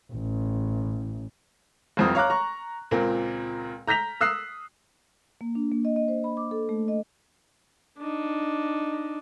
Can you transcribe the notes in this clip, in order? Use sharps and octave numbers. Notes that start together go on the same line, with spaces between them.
A1
F1 C2 F2 C4 D#6
C#5 F5 A#5 D6 F#6
A#5 C#6
C#2 A#2 C4 A#4
A#5 G6 A#6 B6 F7
D#6 E6 F#6 C7
A#3
D4
A#3
D#5
D#5
C5
B5
D6
A4
A3
D#5
D4 D#4